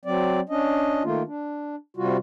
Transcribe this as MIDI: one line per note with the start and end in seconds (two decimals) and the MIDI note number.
0.05 0.40 54
0.05 0.40 60
0.05 0.40 74
0.49 1.03 61
0.49 1.03 62
0.49 1.03 75
1.04 1.23 51
1.04 1.23 57
1.04 1.23 58
1.04 1.23 65
1.26 1.76 62
1.97 2.17 48
1.97 2.17 55
1.97 2.17 65
1.97 2.17 66